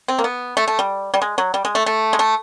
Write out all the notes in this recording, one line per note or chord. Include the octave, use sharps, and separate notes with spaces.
C4
A#3
B3
A3
A3
G3
G3
G#3
F#3
G3
G#3
A3
A3
G#3
A3